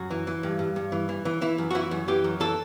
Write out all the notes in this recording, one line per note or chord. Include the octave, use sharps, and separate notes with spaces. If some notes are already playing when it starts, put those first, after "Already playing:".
Already playing: F#2 F#4
E3
E3
G2
G2
G2
E3
E3
E3
E3 E4
F#2
F#4
E3 E4
F#2
E3 G4
F#2
E3 A4